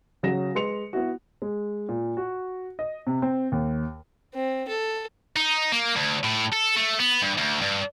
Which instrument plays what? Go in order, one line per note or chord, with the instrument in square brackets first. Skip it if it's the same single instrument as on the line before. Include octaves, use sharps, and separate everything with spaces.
[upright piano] C#3 F#3 F#4 A#6 E7
G#3 B4 C6 C#7 F7
B3 E4 F#4
[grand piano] G#3
A#2
F#4
D#5
C3
C4
D#2
[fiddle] C4
A4
[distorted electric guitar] D#4
A#3
D2
A2
A4
A3
B3
G2
D2
G2